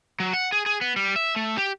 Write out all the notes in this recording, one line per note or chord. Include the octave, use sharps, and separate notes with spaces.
F#3
F#5
G#4
G#4
B3
G3
E5
A3
G4